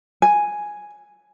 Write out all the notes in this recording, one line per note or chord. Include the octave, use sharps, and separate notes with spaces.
G#5